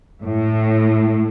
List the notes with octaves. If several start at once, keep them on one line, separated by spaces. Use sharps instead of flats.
A2